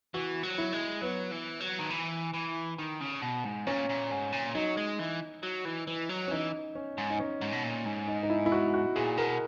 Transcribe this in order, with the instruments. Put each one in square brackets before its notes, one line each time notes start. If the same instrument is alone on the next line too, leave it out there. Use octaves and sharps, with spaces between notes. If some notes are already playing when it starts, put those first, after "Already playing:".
[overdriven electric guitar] E3 [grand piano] F#4
[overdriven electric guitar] F#3
[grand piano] E4
[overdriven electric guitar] G#3
[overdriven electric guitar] F#3 [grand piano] B3
[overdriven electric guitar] E3
F#3
D#3
E3
E3
D#3
C#3
B2
G#2
[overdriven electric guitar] A#2 [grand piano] C#4
[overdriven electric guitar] A#2
G#2
A#2
[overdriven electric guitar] F#3 [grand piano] D#4
[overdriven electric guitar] G#3
E3
F#3
E3
E3
F#3
[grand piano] C#4
[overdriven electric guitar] E3 [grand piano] D#4
[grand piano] C#4
[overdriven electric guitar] G#2
[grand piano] D#4
C#4
[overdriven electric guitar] G#2
B2
A#2
G#2
[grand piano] D#4
D#4
E4
E4
F#4
F#4
[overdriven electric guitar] A#2 [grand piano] G#4
[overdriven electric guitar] B2 [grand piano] A#4